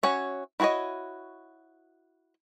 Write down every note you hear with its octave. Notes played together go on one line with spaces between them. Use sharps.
C#4 F#4 C#5 E5
E4 F#4 G#4 C#5 D#5